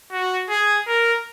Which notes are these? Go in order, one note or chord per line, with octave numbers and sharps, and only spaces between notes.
F#4
G#4
A#4